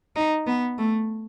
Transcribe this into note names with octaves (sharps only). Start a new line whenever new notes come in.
D#4
B3
A3